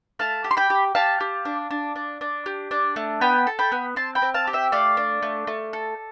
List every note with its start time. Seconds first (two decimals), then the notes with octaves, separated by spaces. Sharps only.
0.19 A3 F5 A5
0.44 G4
0.51 C6
0.57 G5 B5
0.70 G4
0.95 G4 F5 A5
1.20 G4
1.45 D4
1.71 D4
1.96 D4
2.21 D4
2.46 G4
2.71 D4
2.96 A3
3.21 B3 G5 B5
3.47 A4
3.59 G5 B5
3.72 B3
3.96 C4 A5 C6
4.15 G5 B5
4.22 C4
4.34 F5 A5
4.47 G4
4.53 E5 G5
4.72 A3 D5 F5
4.97 D4
5.23 A3
5.47 A3
5.73 A4